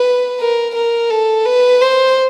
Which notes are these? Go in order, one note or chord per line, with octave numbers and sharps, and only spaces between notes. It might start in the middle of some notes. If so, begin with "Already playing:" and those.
Already playing: B4
A#4
A#4
A4
B4
C5